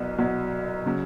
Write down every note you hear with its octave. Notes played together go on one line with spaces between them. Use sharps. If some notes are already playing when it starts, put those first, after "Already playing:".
Already playing: C2 B2 F#3 B3
C2 B2 F#3 B3
C#3 F#3